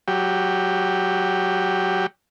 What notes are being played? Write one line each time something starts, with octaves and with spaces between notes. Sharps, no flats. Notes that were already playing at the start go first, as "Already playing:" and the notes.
F#3 G4